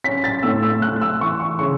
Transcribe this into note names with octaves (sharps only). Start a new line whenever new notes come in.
C#4 B6
A6
A2 E6
E6
A3 F#6
E6
E3 C#6
C#6
C#3 C#6